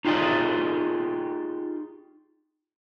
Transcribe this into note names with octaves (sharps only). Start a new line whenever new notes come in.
D#4 F4 G4 G#4 D5